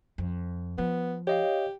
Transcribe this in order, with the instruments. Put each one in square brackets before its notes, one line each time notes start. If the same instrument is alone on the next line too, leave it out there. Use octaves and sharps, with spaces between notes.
[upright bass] F2
[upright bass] F3 [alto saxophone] B3
[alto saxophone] G4 [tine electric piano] C#5 D#5 F5